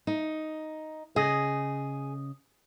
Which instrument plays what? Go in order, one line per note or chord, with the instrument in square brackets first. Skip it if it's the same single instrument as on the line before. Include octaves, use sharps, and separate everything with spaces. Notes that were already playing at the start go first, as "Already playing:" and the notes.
[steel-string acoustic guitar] D#4
[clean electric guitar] C#3 D#5 [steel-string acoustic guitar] G#4